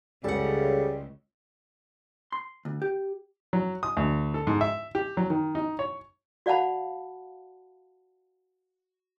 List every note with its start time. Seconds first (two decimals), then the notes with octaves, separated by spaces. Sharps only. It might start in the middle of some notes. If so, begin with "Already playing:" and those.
0.24 C#2 C#3 G3 A4 F#5
2.32 C6
2.65 D2
2.82 G4
3.53 F#3
3.83 D#6
3.97 D2
4.34 A4
4.47 G#2
4.61 E5
4.95 G4
5.17 F#3
5.30 D#3
5.55 D#4
5.79 C#5
6.46 F#4 D5 F5 F#5 A5 B5